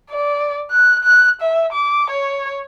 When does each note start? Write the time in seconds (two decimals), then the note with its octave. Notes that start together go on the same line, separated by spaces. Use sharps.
0.10 D5
0.71 F#6
1.04 F#6
1.41 E5
1.72 D6
2.10 C#5